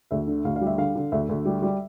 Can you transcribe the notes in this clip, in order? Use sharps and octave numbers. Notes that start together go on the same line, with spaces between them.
D2 E5
D3
D2 F5
F5
G3
E5
D3 F5
D3
D2 E5
D2
G3
G3